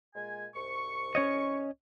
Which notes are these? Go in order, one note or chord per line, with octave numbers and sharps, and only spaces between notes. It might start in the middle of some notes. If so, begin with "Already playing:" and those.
A#2 G#3 G#5
C2 G#2 C#6
C#4 C#5 D#5